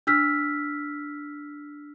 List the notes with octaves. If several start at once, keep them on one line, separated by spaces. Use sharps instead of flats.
D4 E6 F6 B6